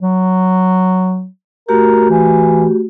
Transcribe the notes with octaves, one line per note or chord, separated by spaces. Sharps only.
F#3
A3 F#4 G4 A#4
E3